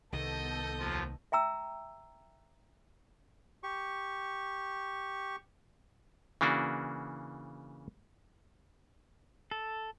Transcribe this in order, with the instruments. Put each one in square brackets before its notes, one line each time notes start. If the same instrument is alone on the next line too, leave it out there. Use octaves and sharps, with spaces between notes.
[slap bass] C2 D#3 [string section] B3 A4 G6 [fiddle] D#5
[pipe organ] D#2 F3 F4
[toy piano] E5 G5 A#5 E6
[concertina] G4 C#6
[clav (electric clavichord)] C#3 E3 A#3 D4 F#4
[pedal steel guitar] A4